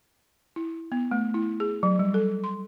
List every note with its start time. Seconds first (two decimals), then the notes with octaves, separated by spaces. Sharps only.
0.56 E4
0.92 B3
1.11 A3
1.34 E4
1.60 G#4
1.83 F#3
1.99 G3
2.14 A4
2.44 C6